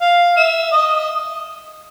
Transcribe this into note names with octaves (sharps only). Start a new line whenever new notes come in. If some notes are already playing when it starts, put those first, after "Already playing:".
F5
E5
D#5